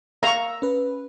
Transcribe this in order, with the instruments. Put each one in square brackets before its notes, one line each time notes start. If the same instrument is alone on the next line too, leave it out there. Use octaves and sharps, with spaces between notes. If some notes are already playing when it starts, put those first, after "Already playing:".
[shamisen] A#3 F5 [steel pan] A#5 C#6 [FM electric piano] E6
[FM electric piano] C#4 B4